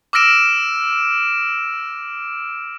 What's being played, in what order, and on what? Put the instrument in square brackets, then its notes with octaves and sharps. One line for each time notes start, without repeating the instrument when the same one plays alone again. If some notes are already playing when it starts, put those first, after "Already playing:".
[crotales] D6 E6 F6 A#6 D7 E7